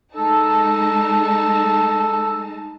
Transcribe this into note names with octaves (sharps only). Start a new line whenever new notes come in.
G#3 D#4 A4 A5